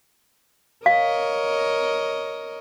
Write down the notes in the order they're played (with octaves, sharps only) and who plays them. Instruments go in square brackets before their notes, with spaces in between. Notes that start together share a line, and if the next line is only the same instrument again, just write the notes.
[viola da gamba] A#4 C#5 D#5 [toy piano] F5